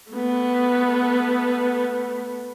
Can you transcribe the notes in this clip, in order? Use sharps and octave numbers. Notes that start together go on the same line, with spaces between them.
A3 B3